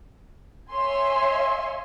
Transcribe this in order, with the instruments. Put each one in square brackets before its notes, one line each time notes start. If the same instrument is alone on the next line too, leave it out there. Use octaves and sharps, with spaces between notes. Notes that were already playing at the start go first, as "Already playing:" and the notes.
[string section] C#5 E5 G#5 C6